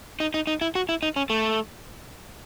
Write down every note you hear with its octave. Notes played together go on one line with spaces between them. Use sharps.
D#4
D#4
D#4
E4
F#4
E4
D#4
C#4
A3